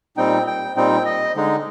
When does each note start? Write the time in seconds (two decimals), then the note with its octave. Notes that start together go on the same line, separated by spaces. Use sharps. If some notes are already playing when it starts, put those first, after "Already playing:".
0.17 A#2 G3 C4 D#4 G5
0.47 G5
0.76 A#2 G3 C4 D#4 G5
1.06 D#5
1.36 D3 G#3 D#4